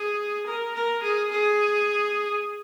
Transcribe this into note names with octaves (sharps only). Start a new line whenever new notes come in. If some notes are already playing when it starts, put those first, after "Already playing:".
Already playing: G#4
A#4
A#4
G#4
G#4